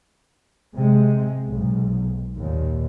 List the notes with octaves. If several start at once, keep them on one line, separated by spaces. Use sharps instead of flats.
C3 G#3
B1 G#2
D#2 A#2